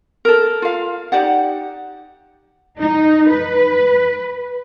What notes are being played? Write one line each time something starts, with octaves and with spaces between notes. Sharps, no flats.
A4 A#4
F4 F5
D#4 G4 D5 F#5
D#4
B4